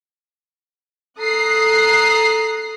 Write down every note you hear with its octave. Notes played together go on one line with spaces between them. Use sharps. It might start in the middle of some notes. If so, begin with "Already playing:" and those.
A4 A#5 D#6 F#6 C7